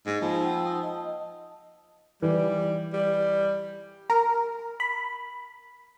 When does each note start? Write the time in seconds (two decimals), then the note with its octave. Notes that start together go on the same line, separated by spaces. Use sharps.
0.06 G#2 A#3
0.21 F3 D#4 G#5 B5
0.41 F#5 G5 E6
0.66 D#6
0.83 D#5 A5
2.22 E3 G3
2.93 G3
4.10 A#4
4.80 B5